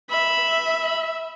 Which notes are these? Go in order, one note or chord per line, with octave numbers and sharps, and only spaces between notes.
E5 B5